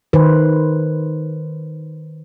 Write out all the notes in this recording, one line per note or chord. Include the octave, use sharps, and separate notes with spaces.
D#3 B4 C5